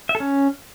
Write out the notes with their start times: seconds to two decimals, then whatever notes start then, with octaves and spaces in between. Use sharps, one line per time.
0.09 E5
0.15 A4
0.20 C#4